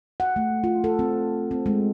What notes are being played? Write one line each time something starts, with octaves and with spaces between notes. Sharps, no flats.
F#5
A3
F4
A4
C4
C4
G#3